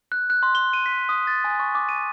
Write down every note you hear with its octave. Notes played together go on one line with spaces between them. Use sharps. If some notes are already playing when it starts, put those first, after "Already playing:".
F#6
F#6
C6
G7
D#7
B6
D#6
A6
G#5
C#6
D6
D#7